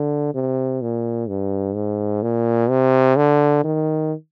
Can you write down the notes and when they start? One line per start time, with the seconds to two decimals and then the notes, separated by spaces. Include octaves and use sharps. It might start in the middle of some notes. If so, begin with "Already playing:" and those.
Already playing: D3
0.34 C3
0.82 A#2
1.28 G2
1.75 G#2
2.23 A#2
2.70 C3
3.17 D3
3.64 D#3